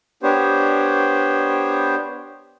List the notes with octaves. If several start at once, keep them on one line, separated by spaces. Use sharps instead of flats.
B3 D4 G4 C5 C#5